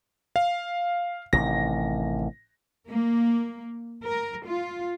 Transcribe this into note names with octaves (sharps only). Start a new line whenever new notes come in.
F5
A1 C3 D#3 A#6
A#3
A#4
F4